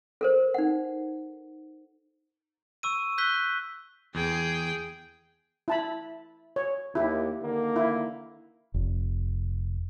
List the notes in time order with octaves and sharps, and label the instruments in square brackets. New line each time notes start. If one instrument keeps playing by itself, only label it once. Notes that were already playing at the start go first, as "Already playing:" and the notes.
[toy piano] A4 A#4 C5
D#4 F#5
[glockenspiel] C#6 E6 D#7
E6 F#6 G6 B6 G7
[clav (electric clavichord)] E2 [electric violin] G#4 G5
[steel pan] E4 A5 B5
C#5
[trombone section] D#2 [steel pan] E4 G4
[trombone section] D3 D#3 A#3
[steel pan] E4
[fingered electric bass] F1